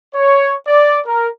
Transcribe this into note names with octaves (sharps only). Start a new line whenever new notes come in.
C#5
D5
A#4